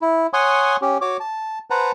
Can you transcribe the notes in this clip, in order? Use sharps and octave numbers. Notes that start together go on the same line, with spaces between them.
E4
C#5 F#5 G#5 C6 C#6 D#6
C#4 G4
F#4 C#5 D6
A5
B4 C5 F#5 A5 A#5